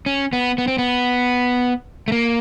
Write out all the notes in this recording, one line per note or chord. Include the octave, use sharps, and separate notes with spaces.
C#4
B3
B3
C4
B3
A3
A#3